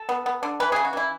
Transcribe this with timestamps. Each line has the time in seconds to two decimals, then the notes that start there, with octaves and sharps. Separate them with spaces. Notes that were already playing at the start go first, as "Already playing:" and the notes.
Already playing: A4
0.09 B3
0.26 B3
0.43 D3
0.60 E3 B4
0.72 C#3 G#4
0.85 F#4
0.93 E3 E4